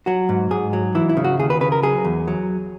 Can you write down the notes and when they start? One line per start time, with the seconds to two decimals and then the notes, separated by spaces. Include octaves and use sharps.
0.06 F#3 F#4
0.29 G#2
0.51 G#2 G#4
0.73 F#3
0.95 E3 E4
1.09 E4
1.17 C#3
1.24 F#4
1.39 D#2 G#4
1.50 B4
1.61 C#3 B4
1.72 A#4
1.82 F#3 G#4
2.05 E2
2.28 F#3